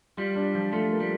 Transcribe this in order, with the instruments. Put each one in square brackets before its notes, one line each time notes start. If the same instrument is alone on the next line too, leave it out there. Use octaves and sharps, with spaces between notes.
[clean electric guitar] G3 [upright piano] F4
[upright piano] D4
F3
[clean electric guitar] A3 [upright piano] F4
[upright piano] A#3
[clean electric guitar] G3